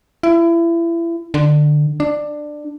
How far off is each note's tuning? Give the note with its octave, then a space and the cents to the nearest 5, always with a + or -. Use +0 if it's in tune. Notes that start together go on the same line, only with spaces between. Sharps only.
E4 +30
D3 +20
D4 +15